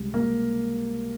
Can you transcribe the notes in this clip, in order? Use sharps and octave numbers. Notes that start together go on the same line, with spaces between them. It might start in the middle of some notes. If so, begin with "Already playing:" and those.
Already playing: C#2 C3 G3
A#3